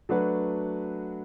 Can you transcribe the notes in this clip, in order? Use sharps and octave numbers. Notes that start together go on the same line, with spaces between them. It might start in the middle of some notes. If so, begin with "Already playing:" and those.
F#3 A3 D4 F#4 B4